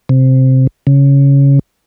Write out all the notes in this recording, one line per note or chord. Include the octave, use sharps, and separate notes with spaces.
C3
C#3